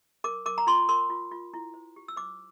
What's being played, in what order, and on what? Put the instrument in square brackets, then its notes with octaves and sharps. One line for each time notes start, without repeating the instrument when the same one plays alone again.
[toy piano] A#4 D6
A#4 D6
A#5
F4 C6
A#4 C6
F4
F4
E4
C5
G4
E6
C5 D6